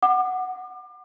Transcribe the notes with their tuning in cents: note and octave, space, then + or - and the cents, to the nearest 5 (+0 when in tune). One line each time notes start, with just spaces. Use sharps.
F#5 +0 D6 +35